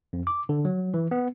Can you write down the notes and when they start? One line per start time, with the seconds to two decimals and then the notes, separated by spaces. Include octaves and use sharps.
0.13 F2
0.27 D6
0.49 D3
0.65 F#3
0.94 E3
1.11 B3